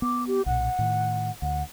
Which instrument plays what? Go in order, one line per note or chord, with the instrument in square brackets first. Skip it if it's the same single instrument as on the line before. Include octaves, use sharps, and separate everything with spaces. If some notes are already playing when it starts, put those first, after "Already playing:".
[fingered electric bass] B3 [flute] D6
[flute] G4
[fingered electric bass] B1 A#2 [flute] F#5
[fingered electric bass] A2 D#3
[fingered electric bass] D2 [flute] F#5